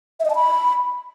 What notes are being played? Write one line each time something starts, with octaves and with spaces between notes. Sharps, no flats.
E5
D#5
A5
B5